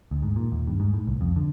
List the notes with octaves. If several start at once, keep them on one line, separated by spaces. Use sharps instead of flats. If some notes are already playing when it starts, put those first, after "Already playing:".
D2
G#2
A#2
D#2
G2
G#2
A2
C2
F2
D3